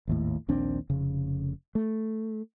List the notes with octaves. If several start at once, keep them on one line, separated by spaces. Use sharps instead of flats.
G#1 D#2 A2
A#1 D#2 C4 D4
F1 C#3
A3